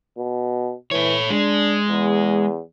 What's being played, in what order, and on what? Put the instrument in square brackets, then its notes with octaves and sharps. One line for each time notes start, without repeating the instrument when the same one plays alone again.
[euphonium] B2
[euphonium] E3 [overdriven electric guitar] A4 C#5
[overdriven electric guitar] G#3 [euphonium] D4
[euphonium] E2